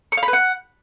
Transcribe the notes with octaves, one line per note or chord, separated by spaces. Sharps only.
C#6
F5
B5
B4
F#5